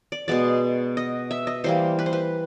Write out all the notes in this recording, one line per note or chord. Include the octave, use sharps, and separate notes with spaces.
D5
B2 G#3 B3 D5
D#5
E5
D#5
E3 G3 A#3 C5
B4
C5
B4